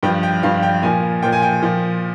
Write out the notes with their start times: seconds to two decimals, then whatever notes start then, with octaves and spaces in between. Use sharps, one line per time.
0.03 G2 F3 G5
0.23 G5
0.43 G2 F3 F5
0.63 G5
0.83 A#2 F3 G#5
1.22 A#2 F3 G5
1.32 G#5
1.42 G5
1.62 A#2 F3